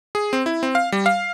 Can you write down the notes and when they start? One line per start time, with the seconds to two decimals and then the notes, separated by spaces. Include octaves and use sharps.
0.15 G#4
0.33 C4
0.46 E4
0.63 C4
0.75 F5
0.92 G3
1.06 F5